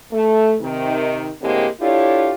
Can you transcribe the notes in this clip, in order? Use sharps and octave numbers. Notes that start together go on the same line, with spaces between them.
A3
C3 D#3
A2 D3 G#3 A#3 C4 G4
D4 E4 F4 G4 A4 C#5